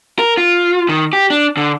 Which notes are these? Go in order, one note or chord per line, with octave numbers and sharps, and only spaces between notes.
A#4
F4
D#3
G4
D4
D3